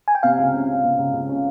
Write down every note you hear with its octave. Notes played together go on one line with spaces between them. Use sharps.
G#5
G5
C3 F5
C#2
C#4
C#4
C3
C#2
C#2
C#4